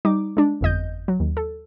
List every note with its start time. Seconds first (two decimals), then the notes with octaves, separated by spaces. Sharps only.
0.05 G3 D#4 D6
0.37 G#3 D4
0.61 G1 F2 D#5 G6
1.08 F#3
1.20 D#2
1.37 A4